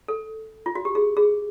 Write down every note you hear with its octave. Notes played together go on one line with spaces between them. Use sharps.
A4
F4
F#4
G4
G#4
G#4